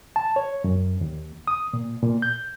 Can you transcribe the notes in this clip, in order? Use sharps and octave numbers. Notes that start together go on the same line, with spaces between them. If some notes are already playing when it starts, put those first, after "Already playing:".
A5
C#5
F#2
D#2
D#6
A#2
A#2
G6